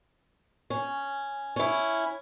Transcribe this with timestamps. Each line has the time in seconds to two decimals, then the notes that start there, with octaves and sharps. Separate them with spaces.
0.70 C#4
1.56 C#4 E4